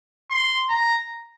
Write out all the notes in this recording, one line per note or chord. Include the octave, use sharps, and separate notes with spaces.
C6
A#5